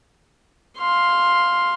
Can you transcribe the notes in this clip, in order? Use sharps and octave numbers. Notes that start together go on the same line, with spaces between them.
F5 C6